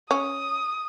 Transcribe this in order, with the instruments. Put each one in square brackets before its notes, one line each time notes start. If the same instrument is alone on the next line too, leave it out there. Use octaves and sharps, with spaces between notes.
[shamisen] C#4 [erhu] D#6